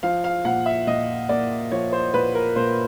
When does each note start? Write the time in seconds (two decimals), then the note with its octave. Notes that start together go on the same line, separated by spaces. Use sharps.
0.03 F3 F5
0.24 F5
0.45 A#2 F#5
0.66 E5
0.87 A#2 D#5
1.29 A#3 D5
1.72 F3 C#5
1.92 C5
2.14 A#2 B4
2.35 A#4
2.56 A#2 C5